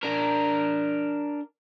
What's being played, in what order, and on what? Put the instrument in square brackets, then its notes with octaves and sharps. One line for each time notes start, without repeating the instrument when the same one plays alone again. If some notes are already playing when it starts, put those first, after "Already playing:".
[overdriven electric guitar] D4 A#4